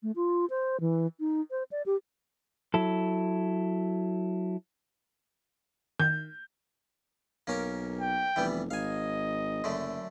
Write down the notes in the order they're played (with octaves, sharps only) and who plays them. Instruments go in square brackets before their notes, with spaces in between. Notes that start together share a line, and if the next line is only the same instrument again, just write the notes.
[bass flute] A3
F4
C5
E3
D#4
C5
D5
G4
[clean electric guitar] F#3 E4 A4
[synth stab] D#3 [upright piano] G6
[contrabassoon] B1 [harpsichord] A#3 C#4 A#4
[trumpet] G5
[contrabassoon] F1 [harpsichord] E3 G3 B3
[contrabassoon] G#1 [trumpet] D#5 [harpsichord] F5 G#5
[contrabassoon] F#1 [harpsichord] F#2 D3 A3